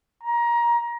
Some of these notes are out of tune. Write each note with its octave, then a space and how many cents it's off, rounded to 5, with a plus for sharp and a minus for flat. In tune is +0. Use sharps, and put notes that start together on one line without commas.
A#5 +20